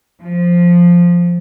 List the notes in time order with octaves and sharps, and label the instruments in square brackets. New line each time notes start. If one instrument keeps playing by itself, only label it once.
[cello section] F3